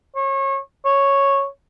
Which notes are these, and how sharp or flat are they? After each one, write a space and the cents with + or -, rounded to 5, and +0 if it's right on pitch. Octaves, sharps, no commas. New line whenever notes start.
C#5 -30
C#5 -5